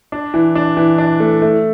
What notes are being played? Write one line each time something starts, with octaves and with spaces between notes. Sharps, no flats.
D4
E3
D4
E3
D4
A3
A3